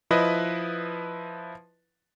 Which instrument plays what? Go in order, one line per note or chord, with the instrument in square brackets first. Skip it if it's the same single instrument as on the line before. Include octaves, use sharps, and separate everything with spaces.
[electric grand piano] F3 E4 B4 D#5